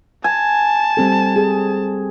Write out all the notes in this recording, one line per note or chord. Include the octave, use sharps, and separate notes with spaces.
G#5 A5
G3 C4 A4
G#4